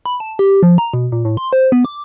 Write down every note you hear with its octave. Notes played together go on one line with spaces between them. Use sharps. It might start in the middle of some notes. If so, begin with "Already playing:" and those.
B5
A5
G4
F3
A#5
B2
A#2
A2
C6
C5
B3
D6